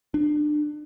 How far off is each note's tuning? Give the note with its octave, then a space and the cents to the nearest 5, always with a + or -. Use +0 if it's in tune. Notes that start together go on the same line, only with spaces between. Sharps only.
D4 +30